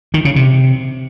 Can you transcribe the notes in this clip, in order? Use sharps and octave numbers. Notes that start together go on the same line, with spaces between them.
D#3
C#3
C3